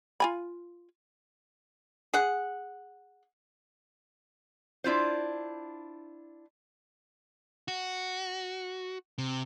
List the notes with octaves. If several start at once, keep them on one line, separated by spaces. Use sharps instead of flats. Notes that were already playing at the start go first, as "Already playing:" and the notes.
F4 G#5 B5
G#4 F#5
D4 E4 F4 C5
F#4
C3